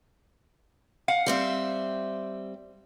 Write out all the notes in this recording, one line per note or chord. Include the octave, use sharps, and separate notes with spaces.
F5 F#5
G3 C4 E5